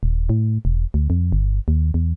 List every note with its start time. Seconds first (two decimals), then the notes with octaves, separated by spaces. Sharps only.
0.03 D#1
0.29 A2
0.65 E1
0.94 D2
1.10 F2
1.32 G1
1.68 D#2
1.94 E2